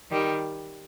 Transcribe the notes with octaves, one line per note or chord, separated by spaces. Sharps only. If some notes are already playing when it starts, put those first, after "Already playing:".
D#3 G3